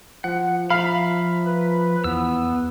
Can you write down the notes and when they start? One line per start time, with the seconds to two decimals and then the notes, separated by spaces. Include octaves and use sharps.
0.24 F3 F#5
0.70 F3 E5 F5 A#5 B5
1.46 B4
2.04 E2 B3 E6